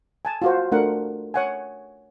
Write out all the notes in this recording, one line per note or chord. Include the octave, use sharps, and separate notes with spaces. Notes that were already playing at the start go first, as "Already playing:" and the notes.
G#5 A5
F4 F#4 C5
A3 D4 A#4 F#5
C#5 F#5 G#5